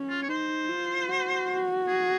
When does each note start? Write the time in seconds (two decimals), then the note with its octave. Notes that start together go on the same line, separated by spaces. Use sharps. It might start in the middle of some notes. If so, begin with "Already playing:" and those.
Already playing: C#4
0.10 F4
0.22 C#5
0.29 D#4 C5
0.69 F4
1.08 F#4
1.88 G#4